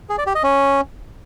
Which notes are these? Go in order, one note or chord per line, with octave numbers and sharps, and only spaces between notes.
G#4
D5
G4
D#5
C#4